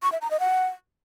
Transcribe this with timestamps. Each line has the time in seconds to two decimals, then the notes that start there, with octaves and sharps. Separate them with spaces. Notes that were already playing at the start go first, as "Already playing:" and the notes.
0.03 C#6
0.12 E5
0.21 A#5
0.31 D#5
0.40 F#5